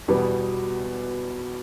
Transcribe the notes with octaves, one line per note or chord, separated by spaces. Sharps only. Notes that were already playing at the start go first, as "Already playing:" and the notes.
E2 B2 G3 B3